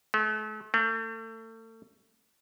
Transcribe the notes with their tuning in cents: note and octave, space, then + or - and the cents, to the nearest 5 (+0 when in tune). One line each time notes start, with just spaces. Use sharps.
A3 -40
A3 +35